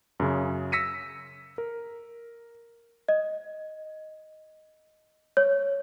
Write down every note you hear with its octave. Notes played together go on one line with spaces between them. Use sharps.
F#2 C#3
E6 A#6 B6 C#7 D#7
A#4
D#5
C#5